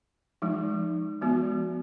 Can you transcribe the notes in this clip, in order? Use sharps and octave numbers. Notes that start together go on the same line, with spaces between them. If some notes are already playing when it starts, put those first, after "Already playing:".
F3 G#3 D#4
F3 G#3 B3 F#4